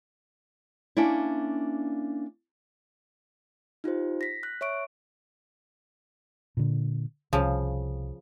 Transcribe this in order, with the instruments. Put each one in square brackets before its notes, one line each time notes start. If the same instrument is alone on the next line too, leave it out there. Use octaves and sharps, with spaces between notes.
[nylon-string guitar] A#3 C#4 D4 E4
[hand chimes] D#4 F4 G4 C5
A#6 B6
F#6
C#5 E5 C#6 D7
[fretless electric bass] A#2 D3
[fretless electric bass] C2 [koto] C#3 F3